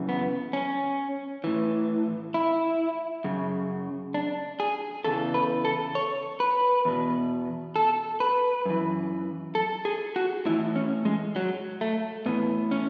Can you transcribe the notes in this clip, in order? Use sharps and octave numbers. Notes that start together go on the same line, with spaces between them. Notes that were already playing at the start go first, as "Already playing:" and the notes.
Already playing: F#2 C#3 E3
B3
C#4
A2 E3
E4
F#2 C#3
D4
G#4
E2 C#3 E3 A4
B4
A4
C#5
B4
E2 B2
A4
B4
F#2 E3
A4
G#4
F#4
A2 E3 E4
C#4
G#3
F#3
A3
A2 E3 B3
C#4